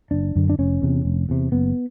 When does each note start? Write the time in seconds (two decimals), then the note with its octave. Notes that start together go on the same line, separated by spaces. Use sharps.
0.11 F#1 D4
0.35 F#2 D3
0.49 D4
0.59 F1 C#4
0.82 E2 C3
1.05 F1
1.29 E2 C3
1.52 F#1 B3